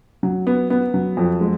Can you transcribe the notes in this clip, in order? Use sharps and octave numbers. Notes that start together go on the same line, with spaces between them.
F#3
B3
B3
F#3
F2
G#3